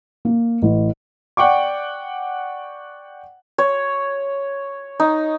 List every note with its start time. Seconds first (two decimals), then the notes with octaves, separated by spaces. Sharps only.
0.25 A#3
0.62 A1
1.37 D5 F#5 G5 C#6 D6
3.58 C#5
5.00 D#4